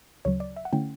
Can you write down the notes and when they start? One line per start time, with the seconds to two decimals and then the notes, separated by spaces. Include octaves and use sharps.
0.25 D2 C#3 F#3 C#5
0.40 D5
0.56 E5
0.65 F#5
0.73 D3 A3 C#4 E4 G5